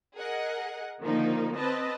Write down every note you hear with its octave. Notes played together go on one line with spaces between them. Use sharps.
G#4 A#4 D#5 F#5
D3 D#3 F3 A#3 D#4
C4 B4 D#5 A5